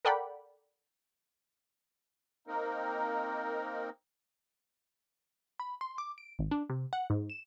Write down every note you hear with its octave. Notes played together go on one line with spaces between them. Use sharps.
A4 A#4 D5 F#5 G5 B5
A#3 C4 D#4 A#4
B5
C6
D6
D7
G#1
D4
C3
F#5
G#2
E7